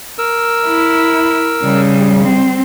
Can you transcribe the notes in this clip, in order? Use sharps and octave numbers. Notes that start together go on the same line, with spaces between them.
A#4 E6
E4
C#3 G3
C4